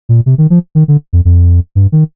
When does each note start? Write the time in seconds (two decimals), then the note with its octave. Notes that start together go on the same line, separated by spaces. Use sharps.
0.09 A#2
0.26 C3
0.38 D#3
0.50 F3
0.75 D#3
0.88 D3
1.13 F2
1.25 F2
1.75 G2
1.92 D#3